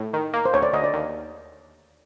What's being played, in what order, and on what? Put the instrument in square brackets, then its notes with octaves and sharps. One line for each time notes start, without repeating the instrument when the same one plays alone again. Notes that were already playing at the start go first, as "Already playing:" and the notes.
Already playing: [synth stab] A2
D#3
A#3
[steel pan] C5
[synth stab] D2 [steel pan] C#5
[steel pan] D5
[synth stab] D2 [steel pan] D#5
[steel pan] D5
[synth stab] D#2